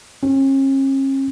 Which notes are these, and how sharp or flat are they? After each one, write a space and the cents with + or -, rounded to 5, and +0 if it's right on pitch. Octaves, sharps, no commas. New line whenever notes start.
C#4 -40